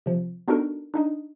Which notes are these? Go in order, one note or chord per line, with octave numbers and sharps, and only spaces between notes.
C3 F3
B3 D4 D#4 F#4 A4 A#4
D4 D#4 D#5